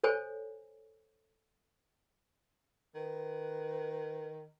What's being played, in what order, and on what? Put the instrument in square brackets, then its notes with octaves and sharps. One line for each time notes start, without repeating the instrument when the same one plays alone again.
[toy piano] A4 C5 C#5 G#5
[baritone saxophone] D#3 [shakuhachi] B4